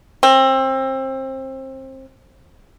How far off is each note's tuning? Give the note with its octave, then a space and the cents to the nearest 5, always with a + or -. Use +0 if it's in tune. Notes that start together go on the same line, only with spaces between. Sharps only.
C4 +25